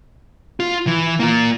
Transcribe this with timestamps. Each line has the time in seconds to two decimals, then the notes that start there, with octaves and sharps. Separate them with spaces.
0.60 F4
0.87 E3
1.20 A#3 F4